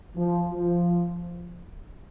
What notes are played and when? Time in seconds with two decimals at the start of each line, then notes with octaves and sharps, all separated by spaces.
0.16 F3
0.52 F3